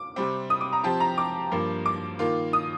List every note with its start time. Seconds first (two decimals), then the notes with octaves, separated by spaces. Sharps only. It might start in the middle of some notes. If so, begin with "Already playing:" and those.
Already playing: D6
0.16 C3 G3 C4
0.50 D#6
0.61 D6
0.73 A#5
0.84 F3 C4 G4 A5
1.00 A#5
1.18 D6
1.51 G2 F3 A#3
1.86 D6
2.19 D#3 A#3 F4
2.53 D#6